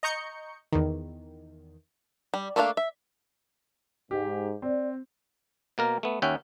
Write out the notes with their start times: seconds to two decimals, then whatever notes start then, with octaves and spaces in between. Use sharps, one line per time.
0.03 D#5 A#5 C#6 G6 C#7
0.72 E2 D#3
2.34 G3
2.56 A3 A#3 D4 C#5 F5
2.77 E5
4.11 G#2 G4
4.62 C4 D5
5.78 B2 A#3 A#4
6.03 A3 B3
6.22 D#2 C#4 E5 F#5 G5